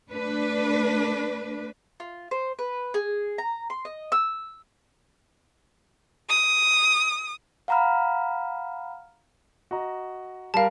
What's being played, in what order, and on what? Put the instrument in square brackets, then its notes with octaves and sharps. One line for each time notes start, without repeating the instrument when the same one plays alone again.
[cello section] A3 D4 B4
[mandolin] F4
C5
B4
G#4
A#5
C6
D#5
E6
[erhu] D#6
[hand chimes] F5 F#5 A#5 B5 F6
[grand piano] F#4 D#5 A#5
[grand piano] G3 A#4 [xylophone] F5 A5